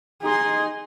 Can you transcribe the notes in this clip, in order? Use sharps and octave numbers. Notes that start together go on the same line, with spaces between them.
D#4 G#4 C6